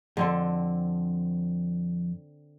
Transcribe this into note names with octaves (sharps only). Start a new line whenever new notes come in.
F2 D3 C4 A4